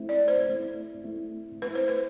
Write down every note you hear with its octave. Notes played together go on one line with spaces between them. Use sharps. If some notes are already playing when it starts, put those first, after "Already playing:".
Already playing: A3 C4 E4
D5
C5
A3 C4 E4
A3 C4 E4
A3 C4 E4 B4
C5
B4